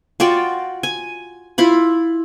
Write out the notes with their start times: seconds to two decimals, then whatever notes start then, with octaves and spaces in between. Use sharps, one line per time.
0.20 F4 F#4 D5 G5
0.83 G#5
1.58 E4 F4 B5